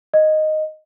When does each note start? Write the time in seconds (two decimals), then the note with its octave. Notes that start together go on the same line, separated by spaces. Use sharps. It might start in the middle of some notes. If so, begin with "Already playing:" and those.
0.14 D#5